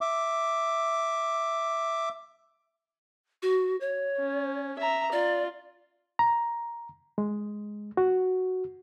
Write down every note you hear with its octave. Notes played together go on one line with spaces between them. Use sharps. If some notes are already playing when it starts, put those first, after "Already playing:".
E5 D6
F#4
C#5
C#4
E5 A#5
F4 D5
A#5
G#3
F#4